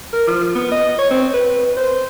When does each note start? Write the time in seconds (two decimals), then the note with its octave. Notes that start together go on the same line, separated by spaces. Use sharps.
0.13 A#4
0.27 F3
0.55 B3
0.72 D#5
0.99 C#5
1.11 C4
1.34 B4
1.59 B4
1.77 C5